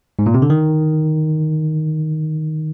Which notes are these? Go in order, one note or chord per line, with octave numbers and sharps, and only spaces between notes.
G#2
A#2
C3
D3
D#3